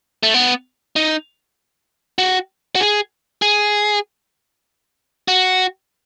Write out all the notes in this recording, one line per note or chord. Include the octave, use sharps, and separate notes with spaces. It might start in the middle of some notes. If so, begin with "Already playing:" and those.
A3
B3
D#4
F#4
F#4
G#4
G#4
F#4